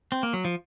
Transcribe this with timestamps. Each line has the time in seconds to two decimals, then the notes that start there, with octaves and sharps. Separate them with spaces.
0.12 C4
0.23 A#3
0.33 F#3
0.45 F3